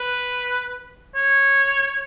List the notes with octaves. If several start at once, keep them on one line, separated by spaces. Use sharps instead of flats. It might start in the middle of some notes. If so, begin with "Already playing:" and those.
Already playing: B4
C#5